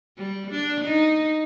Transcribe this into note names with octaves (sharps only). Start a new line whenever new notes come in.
G3
D4
D#4